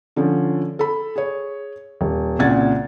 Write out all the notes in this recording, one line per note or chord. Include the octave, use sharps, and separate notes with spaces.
D3 F3 C#4
A4 B5
G#4 C#5
D#1
C2 A#2 C#3 F#5 G#6 A6